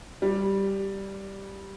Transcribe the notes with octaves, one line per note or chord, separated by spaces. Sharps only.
G3